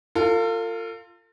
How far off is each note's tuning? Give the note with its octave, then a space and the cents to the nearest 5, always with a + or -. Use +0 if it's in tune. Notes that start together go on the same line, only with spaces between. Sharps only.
F4 +0 A4 +45